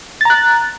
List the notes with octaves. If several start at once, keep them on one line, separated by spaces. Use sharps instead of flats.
A#5 F#6 A6